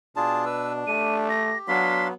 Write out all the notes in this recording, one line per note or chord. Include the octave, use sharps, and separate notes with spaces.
B2 D4 F4 G#4 A5
B4 E6
A3 G4 D#7
A#6
F#3 B3 D4 F5 C6 B6